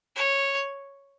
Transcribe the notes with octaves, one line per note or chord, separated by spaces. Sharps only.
C#5